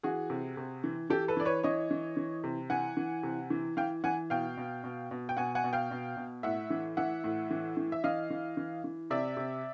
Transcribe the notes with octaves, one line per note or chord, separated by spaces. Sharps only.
E3 F#4 G#4
C3
C3
E3
E3 G4 A4
A4 B4
E3 D5
B4 C#5
E3 C#5 D#5
E3
E3
C3
E3 F#5 G#5
E3
C3
E3
E3 F5 G5
E3 F#5 G#5
B2 F5 G5
B2
B2
B2
G5
B2 F#5 G#5
F#5 G#5
B2
F5 G5
B2
B2
A2 E5 F#5
E3
E3 E5 F#5
A2
E3
E3
E5
E3 D#5 F5
E3
E3
E3
C3 D5 E5
C3